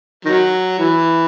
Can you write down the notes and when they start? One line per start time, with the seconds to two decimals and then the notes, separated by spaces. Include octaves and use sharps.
0.25 D#3 F#3
0.79 E3